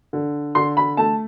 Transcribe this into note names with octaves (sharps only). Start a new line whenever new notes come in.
D3
D3 C6
B5
A3 A5